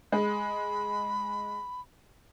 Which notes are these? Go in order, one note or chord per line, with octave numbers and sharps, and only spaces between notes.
G#3 B5